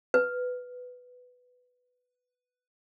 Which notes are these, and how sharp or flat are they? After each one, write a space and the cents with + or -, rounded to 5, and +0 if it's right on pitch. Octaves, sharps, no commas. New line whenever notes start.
B4 +5